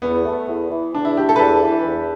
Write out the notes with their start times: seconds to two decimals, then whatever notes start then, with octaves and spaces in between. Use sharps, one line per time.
0.02 E2 B3
0.25 A3
0.49 E2
0.71 E3
0.95 E2 D4
1.05 E4
1.17 A3 G4
1.29 A4
1.36 B4
1.39 E2 A4
1.63 E3
1.85 E2